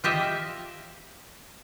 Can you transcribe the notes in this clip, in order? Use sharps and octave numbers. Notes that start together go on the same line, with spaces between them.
F4 G4 D#5 E5